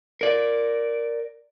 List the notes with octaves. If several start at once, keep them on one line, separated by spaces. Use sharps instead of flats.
A#4 D5